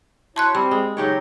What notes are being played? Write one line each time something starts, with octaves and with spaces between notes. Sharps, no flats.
E4 F#4 C#5 A5 C6 F#6
G3 C4 B5
G#3
C#3 F#3 D#4 G4 C#5